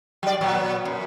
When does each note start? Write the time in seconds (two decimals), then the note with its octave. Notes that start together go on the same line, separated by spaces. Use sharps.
0.23 F#3 D5
0.41 A#2 F#3 B3
0.85 F#2